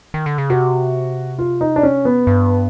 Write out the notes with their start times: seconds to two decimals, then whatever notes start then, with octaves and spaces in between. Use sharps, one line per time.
0.14 D#3
0.26 D3
0.38 C#3
0.50 C3 F#4
1.39 F4
1.61 D#4
1.76 D4
1.83 C#4
2.05 B3
2.27 G2